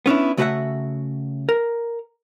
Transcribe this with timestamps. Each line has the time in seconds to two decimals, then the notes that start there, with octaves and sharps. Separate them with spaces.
0.06 B3 C#4 D4 E4
0.37 C#3 A3 F#4 A4 E5 F#5
1.49 A#4